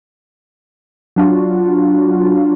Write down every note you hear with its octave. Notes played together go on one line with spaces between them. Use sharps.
F#3 D4 F4 F#4